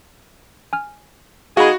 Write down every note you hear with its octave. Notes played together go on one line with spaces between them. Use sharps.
G#5 F6
G#3 D#4 F#4 G#4 F5 B5